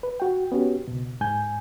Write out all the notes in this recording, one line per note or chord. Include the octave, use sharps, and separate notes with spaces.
B4
F#4 G5
B3 C#4 F#4 G4
C#2 B2
G#2 G#5 G6